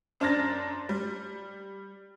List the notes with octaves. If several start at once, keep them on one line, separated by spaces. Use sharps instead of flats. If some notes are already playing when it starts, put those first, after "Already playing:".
F#2 D4 C5 F6 A6 A#6
G3